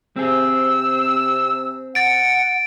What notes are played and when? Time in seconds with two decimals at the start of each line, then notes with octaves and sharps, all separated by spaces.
0.16 C3 C4 G#4 E6
1.95 F#5 A6 D7